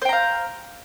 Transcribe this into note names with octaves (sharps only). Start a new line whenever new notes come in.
C5 F5 G5 A#5